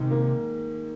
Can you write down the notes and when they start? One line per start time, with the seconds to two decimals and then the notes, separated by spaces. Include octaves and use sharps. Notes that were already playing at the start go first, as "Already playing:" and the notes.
Already playing: G#2 C3 D#3 D#4
0.10 A#3